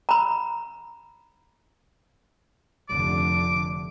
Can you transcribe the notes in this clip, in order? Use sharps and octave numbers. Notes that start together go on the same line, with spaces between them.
A#5 B5
F1 D3 D6